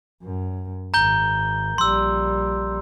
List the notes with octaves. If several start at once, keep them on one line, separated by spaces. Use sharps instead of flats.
F#2
G#1 A#5 G6 G7
A#1 G3 C6 E6